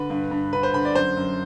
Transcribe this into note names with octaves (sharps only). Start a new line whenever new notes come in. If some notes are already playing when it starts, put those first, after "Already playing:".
Already playing: D3 B4
G2
G2
D3 B4
C5
D3 B5
D5
F#2 C5
F#2